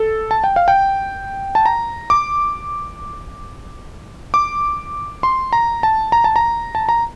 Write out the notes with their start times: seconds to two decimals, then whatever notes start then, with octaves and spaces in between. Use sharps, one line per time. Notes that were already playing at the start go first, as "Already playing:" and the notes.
Already playing: A4
0.31 A5
0.44 G5
0.56 F5
0.68 G5
1.55 A5
1.66 A#5
2.10 D6
4.34 D6
5.23 C6
5.53 A#5
5.83 A5
6.12 A#5
6.24 A5
6.36 A#5
6.75 A5
6.89 A#5